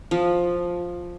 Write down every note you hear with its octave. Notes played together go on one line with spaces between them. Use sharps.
F3